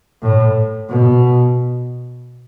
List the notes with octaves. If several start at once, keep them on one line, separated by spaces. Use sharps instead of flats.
A2
B2